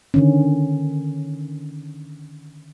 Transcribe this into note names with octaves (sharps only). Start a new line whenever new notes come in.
D3 D#3 C#4